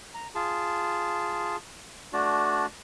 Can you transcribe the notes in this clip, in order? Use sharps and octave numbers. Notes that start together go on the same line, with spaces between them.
A#5
F4 G#4 A5
A3 D4 F#4 D5